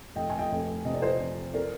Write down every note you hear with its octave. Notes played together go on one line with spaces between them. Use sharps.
F1 D#5 G5
G#5
D#5 G5
F1
C3 D#5
D5
C5 D#5
F2
C4 A#4 D5